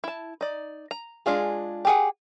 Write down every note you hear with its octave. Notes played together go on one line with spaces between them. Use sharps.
E4 A5
D#4 D5
A#5
G#3 D4 F4 G#4
G4 G#4 F#5